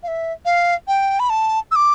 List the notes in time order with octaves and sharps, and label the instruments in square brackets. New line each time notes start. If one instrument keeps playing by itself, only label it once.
[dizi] F5
E5
F5
G5
B5
A5
E6
D6